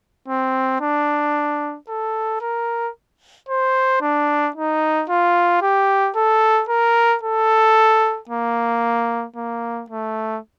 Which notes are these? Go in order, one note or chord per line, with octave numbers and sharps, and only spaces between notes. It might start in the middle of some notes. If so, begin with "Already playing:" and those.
C4
D4
A4
A#4
C5
D4
D#4
F4
G4
A4
A#4
A4
A#3
A#3
A3